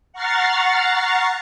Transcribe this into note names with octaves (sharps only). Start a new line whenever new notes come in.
F#5 A#5 C#6 F6 A6 C7